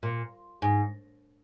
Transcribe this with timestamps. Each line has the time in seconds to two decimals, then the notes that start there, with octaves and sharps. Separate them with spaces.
0.03 A#2
0.62 G#2